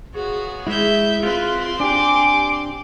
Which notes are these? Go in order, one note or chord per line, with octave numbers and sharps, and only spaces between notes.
B3 F4 F#4 G#4 C#5
G#3 E4 E5 G6
C4 F4 B4 C6
D4 G4 G#5 D6